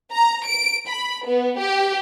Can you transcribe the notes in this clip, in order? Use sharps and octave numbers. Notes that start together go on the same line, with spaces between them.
A#5
D7
B5
B3
G4